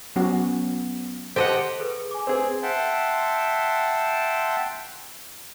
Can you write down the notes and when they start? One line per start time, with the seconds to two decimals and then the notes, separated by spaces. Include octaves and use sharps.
0.16 F#3 B3 C#4 F#4
1.36 G4 A4 C5 D#5 F#5
1.80 G#4 A4 B4
2.11 G#5 D6
2.27 C4 G#4 B4
2.62 E5 F#5 G5 A5 C6